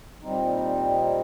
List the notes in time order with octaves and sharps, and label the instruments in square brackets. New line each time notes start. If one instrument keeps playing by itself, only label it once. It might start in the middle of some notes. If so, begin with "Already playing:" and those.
[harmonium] A#2 G3 C4 D#4